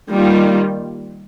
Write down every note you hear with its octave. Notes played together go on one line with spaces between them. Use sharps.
D#3 G3 A#3 F4